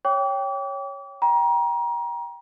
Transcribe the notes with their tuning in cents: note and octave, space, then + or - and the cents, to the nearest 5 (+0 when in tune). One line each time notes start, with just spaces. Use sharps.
C#5 +0 G5 +0 D6 -40
G5 +0 A#5 +30